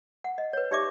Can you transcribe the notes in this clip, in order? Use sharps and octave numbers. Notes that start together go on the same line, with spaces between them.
F#5
D#5
B4 C#5
D#4 G4 D5 E5 C#6 D6